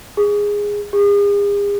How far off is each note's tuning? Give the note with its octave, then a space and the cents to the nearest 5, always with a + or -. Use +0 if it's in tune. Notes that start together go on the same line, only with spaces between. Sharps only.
G#4 -10
G#4 -40